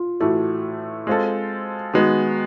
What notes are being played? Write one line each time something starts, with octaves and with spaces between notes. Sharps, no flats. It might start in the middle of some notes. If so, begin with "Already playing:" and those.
Already playing: F4
A2 E3 A3 F#4
G#3 C4 F4 A4
D#3 G#3 B3 F#4